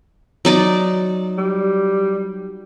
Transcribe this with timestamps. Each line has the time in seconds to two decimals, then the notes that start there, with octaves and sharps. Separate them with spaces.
0.45 F#3 D#4 D5
1.38 G3